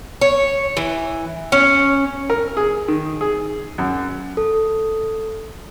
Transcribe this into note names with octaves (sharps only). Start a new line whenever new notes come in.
C#5
E3
C#4
A#4
G#4
D#3
G#4
F#2
A4